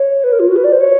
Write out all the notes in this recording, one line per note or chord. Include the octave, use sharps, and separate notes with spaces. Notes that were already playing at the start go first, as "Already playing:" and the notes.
Already playing: C#5
B4
A#4
F4
F#4
B4
D5
C5
C#5